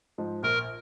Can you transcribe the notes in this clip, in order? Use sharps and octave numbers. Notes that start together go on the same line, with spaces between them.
G#2 F3
A#1 A#4